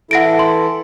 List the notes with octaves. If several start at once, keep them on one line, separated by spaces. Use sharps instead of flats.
E3 E4 A4 F#5 A#6 D7
C6